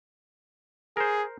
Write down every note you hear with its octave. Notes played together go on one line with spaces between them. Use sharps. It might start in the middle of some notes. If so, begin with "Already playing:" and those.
G#4 A#4 C5